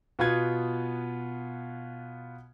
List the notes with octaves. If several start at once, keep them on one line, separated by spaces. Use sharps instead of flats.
B2 B3 F4 F#5 G#6